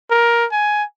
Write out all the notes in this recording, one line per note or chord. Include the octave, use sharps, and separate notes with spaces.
A#4
G#5